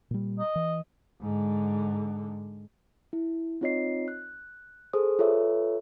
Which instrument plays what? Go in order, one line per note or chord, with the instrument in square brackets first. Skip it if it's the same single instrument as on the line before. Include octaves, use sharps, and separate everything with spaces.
[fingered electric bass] A#2 G3
[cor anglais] D#5
[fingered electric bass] E3
[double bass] G#2 D3
[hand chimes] E4
C4 D#4 F4 C#5 D#5 C7
F#6
G#4 A4 C5 D#6
F4 A4 B4 C#5 E5